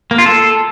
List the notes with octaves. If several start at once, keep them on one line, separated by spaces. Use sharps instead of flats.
A#3
F4
A4